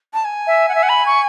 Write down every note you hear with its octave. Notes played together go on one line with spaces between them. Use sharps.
A5
G#5
E5
F#5
E5
F#5
B5
C#6